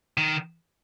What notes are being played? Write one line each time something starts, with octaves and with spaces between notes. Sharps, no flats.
D#3